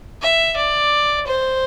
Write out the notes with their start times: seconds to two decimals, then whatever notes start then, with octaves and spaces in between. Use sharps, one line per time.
0.22 E5
0.56 D5
1.27 C5